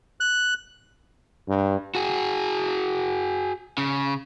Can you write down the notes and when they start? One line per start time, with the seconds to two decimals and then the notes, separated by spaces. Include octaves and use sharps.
0.20 F#6
1.49 G2
1.95 F#4 G#4
3.78 C#3